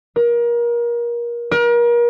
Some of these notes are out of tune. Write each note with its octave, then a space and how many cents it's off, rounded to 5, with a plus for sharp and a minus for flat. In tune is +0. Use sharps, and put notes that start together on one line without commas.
A#4 +30
A#4 +35